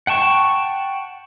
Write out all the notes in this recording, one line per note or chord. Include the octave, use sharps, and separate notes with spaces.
F#5 G5 A5 C#6